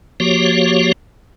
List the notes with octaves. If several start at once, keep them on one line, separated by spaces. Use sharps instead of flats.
F3 A#3 F#4 G4 C#5